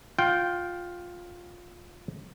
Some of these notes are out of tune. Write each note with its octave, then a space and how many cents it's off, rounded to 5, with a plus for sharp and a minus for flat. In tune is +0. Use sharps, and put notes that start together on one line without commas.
F4 +10 G5 -10